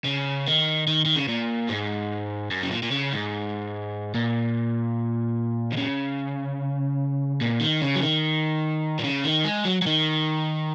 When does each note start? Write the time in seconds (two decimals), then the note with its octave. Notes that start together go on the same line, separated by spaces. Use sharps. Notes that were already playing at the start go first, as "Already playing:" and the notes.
0.05 C#3
0.47 D#3
0.87 D#3
1.06 D#3
1.16 C#3
1.29 A#2
1.69 G#2
2.51 F#2
2.63 C#3
2.71 A#2
2.83 A#2
2.91 C#3
3.13 G#2
4.15 A#2
5.73 D#3
5.77 C#3
7.41 A#2
7.61 D#3
7.82 C#3
7.96 F#3
8.02 D#3
8.99 A#2
9.04 C#3
9.25 D#3
9.45 G#3
9.65 F#3
9.82 F#3
9.87 D#3